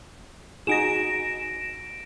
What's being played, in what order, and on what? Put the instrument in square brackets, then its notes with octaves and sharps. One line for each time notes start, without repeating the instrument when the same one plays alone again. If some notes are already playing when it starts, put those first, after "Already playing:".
[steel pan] D#4 F#4 G#4 [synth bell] A#6 D7 E7